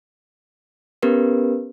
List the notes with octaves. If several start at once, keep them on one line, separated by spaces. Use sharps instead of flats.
B3 C#4 G4 A#4 B4